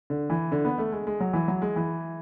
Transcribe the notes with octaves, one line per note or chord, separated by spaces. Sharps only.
D3
E3
D3
B3
A3
G#3
G#3
F#3
E3
F#3
G#3
E3